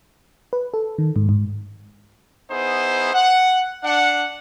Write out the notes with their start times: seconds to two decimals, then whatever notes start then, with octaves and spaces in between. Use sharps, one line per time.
0.53 B4
0.74 A4
0.98 D#3
1.16 G#2
1.29 G#2
2.51 B3 D#4 E4 G#4 C5
3.14 F#5
3.84 D4 F#5